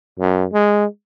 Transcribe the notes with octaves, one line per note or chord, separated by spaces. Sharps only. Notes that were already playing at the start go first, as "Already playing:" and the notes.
F#2
G#3